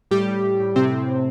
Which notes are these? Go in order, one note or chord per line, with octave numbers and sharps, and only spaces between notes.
A2 G3 G4
A2
A2
A2
A2 C3 C4
A2
A2